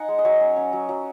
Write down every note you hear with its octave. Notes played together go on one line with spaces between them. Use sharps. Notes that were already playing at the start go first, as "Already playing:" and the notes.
Already playing: D#4 F#5 G#5
G#3
D#5
F#3 C#5
C#4
C#4
F#3
F#3